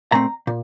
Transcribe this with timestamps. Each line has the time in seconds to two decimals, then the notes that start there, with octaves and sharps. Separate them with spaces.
0.12 A#2 A3 C4 A#5
0.47 A#2